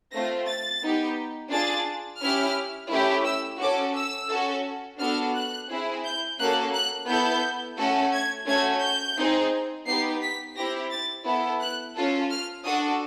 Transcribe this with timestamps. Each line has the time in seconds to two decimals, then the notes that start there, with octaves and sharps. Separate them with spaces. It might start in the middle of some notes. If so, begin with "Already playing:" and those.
0.12 A3 C4 F4 A#6
0.47 A6
0.82 B3 D#4 G4
1.51 D4 F4 G#4 A6
2.21 C#4 E4 G4 F6
2.91 A3 C#4 E4 G4
3.26 E6
3.60 C#4 F#4 A4 D6
3.96 E6
4.30 C#4 F#4 A4
4.99 B3 D4 F#4 A4 F6
5.34 F#6
5.69 C4 E4 G#4
6.04 G6
6.39 A#3 C#4 F#4 A4 F#6
6.74 F#6
7.08 B3 E4 A4 G6
7.78 A3 C#4 F#4 A4
8.13 G#6
8.47 A3 C#4 F#4 G#6
8.83 G6
9.17 C4 D#4 G#4
9.87 B3 D#4 G4 C7
10.22 B6
10.56 C4 E4 G4 A#6
10.91 A6
11.26 B3 E4 A4
11.61 F#6
11.95 C#4 F4 A4
12.31 F6
12.65 D4 F#4 A4 D#6